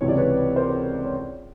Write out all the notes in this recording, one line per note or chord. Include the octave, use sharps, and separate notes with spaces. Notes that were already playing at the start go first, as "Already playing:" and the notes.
C#2 C3 E3 C#5
D5
B4 C#5
A#4 C5
C#5